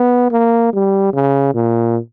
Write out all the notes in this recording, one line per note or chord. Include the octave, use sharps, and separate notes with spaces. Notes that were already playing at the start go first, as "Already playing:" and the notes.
Already playing: B3
A#3
G3
C#3
A#2